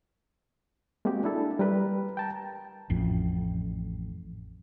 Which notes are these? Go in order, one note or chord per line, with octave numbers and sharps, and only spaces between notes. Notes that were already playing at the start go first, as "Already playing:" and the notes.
G#3 A#3 C4 F#4 G4
D4 E4 A4
G3 A#4 B4
G5 A5 A#5
A1 F2